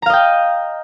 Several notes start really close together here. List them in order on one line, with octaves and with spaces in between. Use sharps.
A#5 F5 D#5 G5